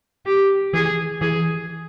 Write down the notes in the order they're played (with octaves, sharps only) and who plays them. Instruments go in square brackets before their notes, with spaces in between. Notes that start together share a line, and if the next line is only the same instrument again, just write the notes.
[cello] G4
[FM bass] E3 [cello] G#4
[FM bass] E3 [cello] G#4